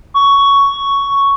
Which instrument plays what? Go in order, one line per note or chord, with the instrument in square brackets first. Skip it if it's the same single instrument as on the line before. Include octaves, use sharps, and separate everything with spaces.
[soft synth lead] C#6